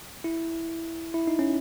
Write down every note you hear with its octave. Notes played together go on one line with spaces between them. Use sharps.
E4
E4
D#4
C#4